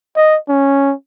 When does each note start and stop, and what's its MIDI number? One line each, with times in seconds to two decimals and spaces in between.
0.16 0.38 75
0.49 0.93 61